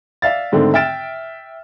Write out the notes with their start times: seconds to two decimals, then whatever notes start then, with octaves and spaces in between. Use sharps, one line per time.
0.22 D5 E5 F5 A6
0.52 G#2 D3 D#3 A3 C4
0.74 E5 G5 F6 A6 D7 E7